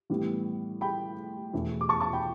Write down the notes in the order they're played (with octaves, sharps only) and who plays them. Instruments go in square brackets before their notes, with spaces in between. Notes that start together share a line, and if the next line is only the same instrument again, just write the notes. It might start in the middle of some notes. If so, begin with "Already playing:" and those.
[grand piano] A2 E3 G3 B3
G5 B5
E2 B2 A3 E4
D6
A5 C#6
A5 C#6
G5 B5